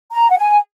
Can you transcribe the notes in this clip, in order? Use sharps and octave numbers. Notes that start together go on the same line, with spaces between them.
A#5
F#5
G#5